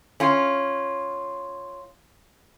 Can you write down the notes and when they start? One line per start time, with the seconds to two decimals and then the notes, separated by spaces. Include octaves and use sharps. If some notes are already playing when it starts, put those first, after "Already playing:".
0.20 C#4 F4